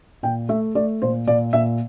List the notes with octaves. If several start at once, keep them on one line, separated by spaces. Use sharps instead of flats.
A#2 G5
A3 E5
A3 D5
A#2 C5
A#2 D5
A#2 E5